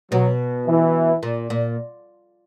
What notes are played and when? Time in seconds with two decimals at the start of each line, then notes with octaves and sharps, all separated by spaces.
0.12 B2 F#3
0.67 E3
1.23 A#2
1.50 A#2